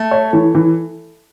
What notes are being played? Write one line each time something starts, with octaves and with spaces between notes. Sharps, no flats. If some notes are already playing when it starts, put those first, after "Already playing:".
Already playing: A3
C#5
E3
E3